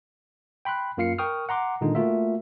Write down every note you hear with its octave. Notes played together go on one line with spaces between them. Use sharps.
G5 B5 C6 F#6
F#2 A#3 F4 F5 C7 C#7
A#4 G5 C#6 D#6 F6
F#5 A#5 C6 D6
A#2 D3 D#3 G#3 D#4
A3 A#3 F4 F#4 A#4 E5